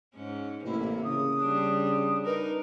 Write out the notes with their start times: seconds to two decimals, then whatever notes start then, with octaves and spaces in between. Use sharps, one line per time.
0.15 G#2 C#4
0.64 A1 C3 A#3 E4
1.04 C#3 D#6
1.39 G3 D4
2.25 D#4 A#4 B4